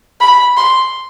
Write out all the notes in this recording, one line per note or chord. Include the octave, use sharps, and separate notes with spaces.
B5
C6